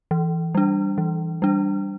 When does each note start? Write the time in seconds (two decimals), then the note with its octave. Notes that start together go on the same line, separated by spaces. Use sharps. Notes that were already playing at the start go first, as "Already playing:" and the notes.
0.11 E3
0.55 G3 D4
0.98 E3
1.42 G3 D4